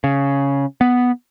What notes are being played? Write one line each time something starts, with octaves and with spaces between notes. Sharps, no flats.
C#3
B3